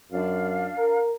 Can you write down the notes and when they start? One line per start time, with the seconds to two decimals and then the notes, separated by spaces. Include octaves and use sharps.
0.11 F#2 D4 F5
0.78 A#4